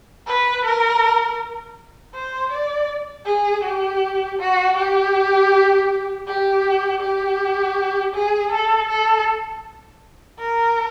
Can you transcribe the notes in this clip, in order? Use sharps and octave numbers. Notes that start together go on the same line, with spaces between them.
B4
A#4
C5
D5
G#4
G4
F#4
G4
G4
G4
G#4
A4
A4
A#4